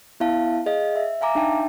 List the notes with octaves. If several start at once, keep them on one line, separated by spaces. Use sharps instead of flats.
B3 E4 E5 F5 A5
G#4 D#5 F5
E5
E5 F5 G#5 A#5 D6
D4 D#4 E5 G5 A5